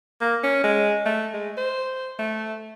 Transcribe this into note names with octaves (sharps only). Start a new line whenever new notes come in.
A#3
C#4
G#3
A3
G#3
C5
A3